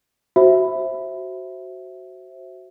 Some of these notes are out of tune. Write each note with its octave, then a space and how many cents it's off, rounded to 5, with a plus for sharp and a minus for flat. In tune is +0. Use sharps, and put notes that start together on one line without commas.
F#4 +10 C5 +15 E5 +0